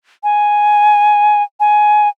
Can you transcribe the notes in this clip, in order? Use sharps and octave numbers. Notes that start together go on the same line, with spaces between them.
G#5
G#5